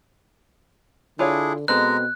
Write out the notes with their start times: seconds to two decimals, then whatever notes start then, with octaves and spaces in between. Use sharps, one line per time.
1.19 D3 D4 E4 F4 G#4 C#5 F5
1.68 B2 G#3 C4 A4 B4 A#5 F#6